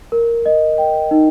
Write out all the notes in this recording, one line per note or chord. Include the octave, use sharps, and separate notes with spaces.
A#4
D#5
G5
D#4